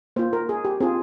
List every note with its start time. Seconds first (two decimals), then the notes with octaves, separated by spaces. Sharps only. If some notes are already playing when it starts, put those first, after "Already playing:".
0.16 A#3 F4 C5
0.33 A#4
0.49 G#4
0.65 G4
0.80 C4 F4 G#4